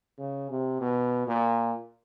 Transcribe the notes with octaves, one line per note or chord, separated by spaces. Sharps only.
C#3
C3
B2
A#2